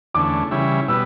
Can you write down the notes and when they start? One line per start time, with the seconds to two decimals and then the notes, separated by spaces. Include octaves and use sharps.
0.14 E2 D3 A3 C#4 D6
0.51 C#3 E3 G3 C#4 E4
0.88 B2 G3 B3 E6